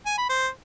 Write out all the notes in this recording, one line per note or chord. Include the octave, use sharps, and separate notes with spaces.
G#5
B5
C5